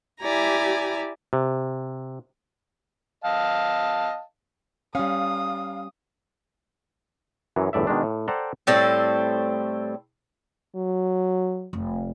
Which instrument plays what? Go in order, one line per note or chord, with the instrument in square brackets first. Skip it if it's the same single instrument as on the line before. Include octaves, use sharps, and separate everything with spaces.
[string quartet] E4 G4 D5 G#5 A#5
[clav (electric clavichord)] C3
[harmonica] D#5 F5 A5
[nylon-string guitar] G3 C#4 [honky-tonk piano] F5 [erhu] D#6
[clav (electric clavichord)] F#2 E3 F#3
G1 E2 A2 D5 E5
B2 D#3 G#3 D4
A2
A4 C5 D5 F#5 G5 A#5
[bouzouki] A2 G3 C4 A4
[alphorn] F#3
[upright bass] F1